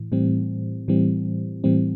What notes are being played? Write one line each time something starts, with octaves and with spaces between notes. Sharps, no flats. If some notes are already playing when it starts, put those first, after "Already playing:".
Already playing: A2 E3
A2 E3 G3 C4
A2 E3 G3 C4
A2 E3 G3 C4